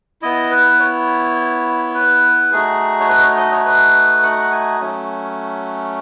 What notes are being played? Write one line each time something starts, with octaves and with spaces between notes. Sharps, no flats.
B3 E4 D#5
B4
C#5
B4
A3 D#4 F#4 G#4
C#5
B4
D#5
C#5
D#5
C#5
B4
F#5
G#5
F#3 A3 C#4